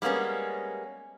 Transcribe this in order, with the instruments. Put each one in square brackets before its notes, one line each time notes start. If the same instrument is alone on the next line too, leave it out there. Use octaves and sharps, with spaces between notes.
[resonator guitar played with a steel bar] G3 G#3 A#3 B3 C#4